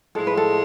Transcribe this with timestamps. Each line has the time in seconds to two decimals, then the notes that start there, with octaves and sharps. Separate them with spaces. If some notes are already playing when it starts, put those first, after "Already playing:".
0.15 A2 F3 G#3 A4
0.27 B4
0.37 A4